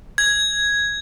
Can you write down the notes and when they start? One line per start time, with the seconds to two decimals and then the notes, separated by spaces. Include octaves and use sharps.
0.18 G#6